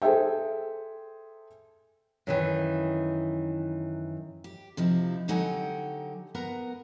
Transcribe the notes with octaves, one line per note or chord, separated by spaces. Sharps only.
G#4 A4 C5 E5 G5
F#2 D#3 E3
G4
C3 F3 D#4 E4
D3 F#3 D#4 G4 F#5 G#5
B3 A#4 F#5 A#5